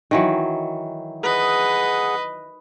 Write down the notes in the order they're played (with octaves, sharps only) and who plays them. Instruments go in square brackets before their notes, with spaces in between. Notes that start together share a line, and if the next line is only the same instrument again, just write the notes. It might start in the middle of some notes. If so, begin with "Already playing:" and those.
[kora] D#3 E3 F#3
[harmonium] G#4 F#5 [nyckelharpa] B4 D#5